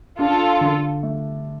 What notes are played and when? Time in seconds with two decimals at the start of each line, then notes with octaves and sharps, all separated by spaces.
0.19 D4 F4 A4
0.61 D3
1.03 A3